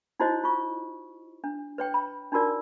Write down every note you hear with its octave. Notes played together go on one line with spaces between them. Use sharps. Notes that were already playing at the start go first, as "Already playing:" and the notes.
D#4 E4 F#4 C5 C#5 D#5
F4 C#6
D4
B4 C#5 G5
B5
D4 D#4 F4 F#4 A#4 D5